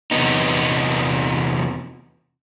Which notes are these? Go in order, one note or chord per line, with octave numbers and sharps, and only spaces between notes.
E2 C3 B3 D#4